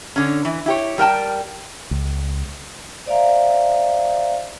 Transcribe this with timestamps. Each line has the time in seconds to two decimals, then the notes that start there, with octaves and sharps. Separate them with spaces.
0.16 D3 C#4
0.45 E3
0.66 E4 G4 C#5
0.98 G3 A#4 G5 A5
1.91 C#2
3.06 C5 D5 E5 F5 A#5